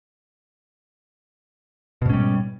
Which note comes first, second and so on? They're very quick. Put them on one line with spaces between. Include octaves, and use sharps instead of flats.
B2 G#2 C#4 G3